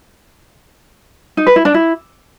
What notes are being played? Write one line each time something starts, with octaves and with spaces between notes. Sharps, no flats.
D#4
B4
E4
D4
E4